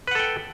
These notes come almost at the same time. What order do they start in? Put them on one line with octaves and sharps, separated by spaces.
B4 F#5 A4 G5